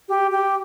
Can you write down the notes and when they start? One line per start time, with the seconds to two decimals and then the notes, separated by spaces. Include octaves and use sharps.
0.09 G4
0.31 G4